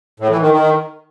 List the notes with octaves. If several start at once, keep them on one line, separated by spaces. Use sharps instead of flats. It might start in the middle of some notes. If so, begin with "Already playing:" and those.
A2
E3
D#3
D#3